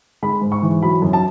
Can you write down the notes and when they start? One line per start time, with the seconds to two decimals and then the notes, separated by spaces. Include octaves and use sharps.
0.23 G#3 B5
0.42 G#2
0.52 C#6
0.62 E3
0.82 F#3 B5
1.02 F#2
1.13 A5